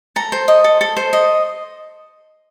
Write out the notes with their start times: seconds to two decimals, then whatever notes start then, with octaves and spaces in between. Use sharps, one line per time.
0.16 A4 A#5
0.32 C5
0.48 D#5
0.64 A4
0.81 A4
0.97 C5
1.13 D#5